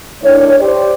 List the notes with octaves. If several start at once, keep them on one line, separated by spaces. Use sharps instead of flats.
D#3 A3 D4 E4 C#5
G4 C5 D5